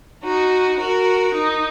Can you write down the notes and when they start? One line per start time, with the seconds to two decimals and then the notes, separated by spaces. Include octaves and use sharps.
0.24 D#4 F#4
0.79 F#4 A#4
1.34 D#4